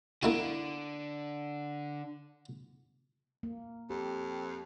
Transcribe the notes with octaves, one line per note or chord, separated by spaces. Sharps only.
D3 A#3 E4 F#4
A#3
F2 G4